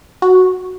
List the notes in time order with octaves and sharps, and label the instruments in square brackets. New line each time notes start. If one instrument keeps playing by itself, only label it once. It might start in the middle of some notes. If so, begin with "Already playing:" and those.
[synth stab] F#4